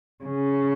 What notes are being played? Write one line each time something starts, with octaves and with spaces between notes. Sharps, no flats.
C#3